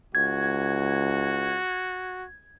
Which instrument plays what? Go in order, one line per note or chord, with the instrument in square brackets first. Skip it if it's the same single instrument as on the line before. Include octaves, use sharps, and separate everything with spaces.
[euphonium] C#2 [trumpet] F#4 [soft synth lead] G#6